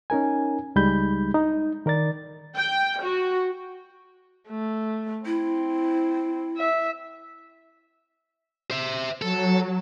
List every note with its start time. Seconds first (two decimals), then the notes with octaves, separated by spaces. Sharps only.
0.10 C#4 D#4 A#4 G#5
0.76 C#2 G3 G#3 D#4 B5 G6
1.34 D#4
1.86 D#3 A#4 D5 A6
2.56 G5
3.02 F#4
4.49 A3
5.26 C4 E4
6.58 E5
8.71 C5 E5
9.22 F#3 A4